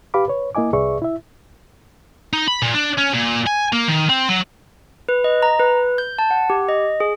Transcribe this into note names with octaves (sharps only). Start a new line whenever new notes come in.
G4 B4 F5 B5 D6
B4 C#5
A#3 E4 D#5 G#5 D6
C2 G#4 B4 D5 E5 C#6
E4 E5
D#4
B5
A#2
D4
C#4
A#2
G#5
A#3
D#3
C4
F#3
B4
D#5
A#5
B4
G6
A5
F#5
G4
D#5
G#4